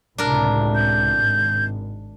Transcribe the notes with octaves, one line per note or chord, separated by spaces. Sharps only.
C#2 A2 C3 D4 A#4
G6
G#1